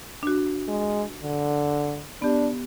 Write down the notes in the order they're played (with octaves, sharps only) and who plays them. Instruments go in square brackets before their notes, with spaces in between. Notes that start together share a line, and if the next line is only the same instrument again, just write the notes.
[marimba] D4 F#4
[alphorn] G#3
D3
[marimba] B3 G4 [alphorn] D4